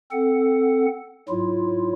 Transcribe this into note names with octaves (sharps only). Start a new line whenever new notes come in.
C4 A4 F#5
G#2 F#3 E4 F4